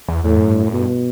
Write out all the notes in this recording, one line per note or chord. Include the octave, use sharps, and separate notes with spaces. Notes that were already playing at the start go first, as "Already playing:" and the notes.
E2
E2 A2
F#2
G2
F#2
G2 B2